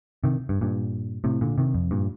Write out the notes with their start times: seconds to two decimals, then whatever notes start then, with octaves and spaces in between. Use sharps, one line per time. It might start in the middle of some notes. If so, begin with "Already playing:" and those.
0.24 C3 D#3
0.49 G2
0.61 G2 A#2
1.24 A2 C3
1.41 A#2 D3
1.58 C3 D#3
1.74 F2
1.91 G2 A#2